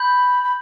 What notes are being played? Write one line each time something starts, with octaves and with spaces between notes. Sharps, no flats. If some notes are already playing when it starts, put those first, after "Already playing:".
Already playing: B5 G6
B5